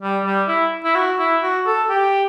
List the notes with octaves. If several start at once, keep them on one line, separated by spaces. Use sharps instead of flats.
G3
G3
E4
E4
F#4
E4
F#4
A4
G4